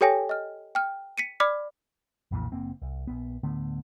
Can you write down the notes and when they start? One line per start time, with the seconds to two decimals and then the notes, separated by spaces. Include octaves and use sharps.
0.01 G4 A4 C#5 G5 G#5 A#6
0.29 D#5 F6
0.75 G5 F6
1.18 B6 C#7 D#7
1.40 D5 B5 D6 F6 B6
2.31 B1 F2 A#2 E3
2.52 F#1 A#3 C4
2.82 C2
3.07 A#1 B3
3.43 D1 D3 A3 B3